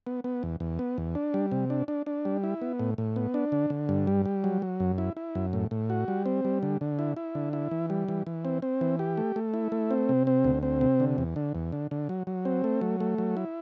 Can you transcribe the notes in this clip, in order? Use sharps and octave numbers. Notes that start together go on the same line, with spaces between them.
B3
B3
E2
E2
B3
E2
D4
G3
C3
D4
D4
D4
G3
E4
B3
A2
A2
B3
D4
D3
D3
G2
G3
G3
F#3
F#3
F#2
E4
E4
F#2
A2
A2
F#4
G3
C4
G3
D3
D3
E4
E4
D3
E4
E3
G3
E3
E3
C4
C4
E3
G4
A3
A3
E4
A3
C4
C3
C4
D2
C4
C3
D3
E2
D3
E2
D3
D3
F#3
F#3
C4
A3
F#3
A3
F#3
E4